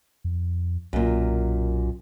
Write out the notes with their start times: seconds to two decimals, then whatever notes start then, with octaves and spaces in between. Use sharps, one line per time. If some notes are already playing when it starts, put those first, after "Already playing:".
0.24 F2
0.93 B1 F#2 A#2